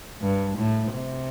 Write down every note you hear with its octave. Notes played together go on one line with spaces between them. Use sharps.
G2
A2
C3